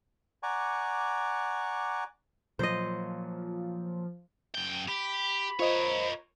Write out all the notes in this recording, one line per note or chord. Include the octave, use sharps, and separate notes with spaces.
D5 F#5 G#5 A#5 C#6 D6
A#2 F3 F#3 C5 D#5
F#2 G5
G4 B5
F4 A#4 C5 C#5 D#5